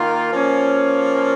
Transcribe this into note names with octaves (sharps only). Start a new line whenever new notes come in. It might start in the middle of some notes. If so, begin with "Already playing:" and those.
Already playing: D#3 A#3 F4
F3 A#3 C#4